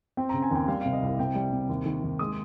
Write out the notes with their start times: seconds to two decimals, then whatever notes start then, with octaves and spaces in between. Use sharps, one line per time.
0.17 C4 G5
0.29 A#5
0.34 C#3
0.42 G#5
0.51 D#2 G5
0.68 G3 F5
0.81 F5
0.85 C3
0.93 D#5
1.02 C2 F5
1.19 C3 G5
1.35 G3
1.52 C3
1.69 D#2
1.86 D#3
2.04 D#2
2.19 G#3 D#6